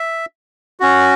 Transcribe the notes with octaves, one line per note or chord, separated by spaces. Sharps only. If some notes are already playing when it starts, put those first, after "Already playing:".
Already playing: E5
C#4 F#4